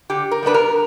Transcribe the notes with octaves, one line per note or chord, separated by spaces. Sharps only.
D3 G4
A#4
G3 B3 D4 B4
A#4